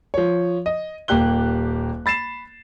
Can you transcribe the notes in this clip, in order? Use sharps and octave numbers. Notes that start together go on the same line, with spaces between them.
F3 C#5
D#5
D#1 A#3 G4 F#6 G7
B5 A6 C7 E7